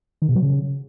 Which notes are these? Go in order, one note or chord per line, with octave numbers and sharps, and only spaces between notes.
D#3
B2
F#3
C#3